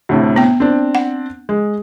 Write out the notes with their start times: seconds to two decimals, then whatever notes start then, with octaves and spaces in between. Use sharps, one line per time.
0.09 D2 A2 C3
0.36 B3 G5
0.60 C4 D4
0.95 F#5
1.49 G#3